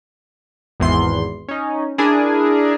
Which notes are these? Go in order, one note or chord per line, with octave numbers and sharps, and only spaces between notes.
G#1 E2 C6
C#4 D#4
D4 E4 G#4 A#4